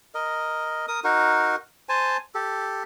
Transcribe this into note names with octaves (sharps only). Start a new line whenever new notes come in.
A#4 D#5
A#4 D#6
D#4 F#4 A#4
C5 G#5 A5
G4 A4